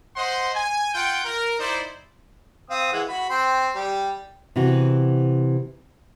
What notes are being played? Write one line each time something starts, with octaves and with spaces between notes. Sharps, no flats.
C5 D#5 F#5 C6
G#5
F4 F#5 G5
A#4
D#4 E4 C5 D5
C4 F5 D#6
E3 G#3 F#5
F#4 B5
C4 G5 C6
G3 G4
C3 E3 F#4